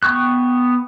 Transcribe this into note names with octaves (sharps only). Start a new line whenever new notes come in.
B3 G5 C#6 F#6